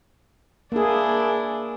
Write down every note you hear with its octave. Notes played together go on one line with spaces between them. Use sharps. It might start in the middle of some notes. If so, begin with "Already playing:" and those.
A#3 D4 E4 G#4